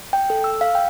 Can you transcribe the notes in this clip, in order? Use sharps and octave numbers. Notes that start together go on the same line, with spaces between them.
G5
A4
E6
F5
G5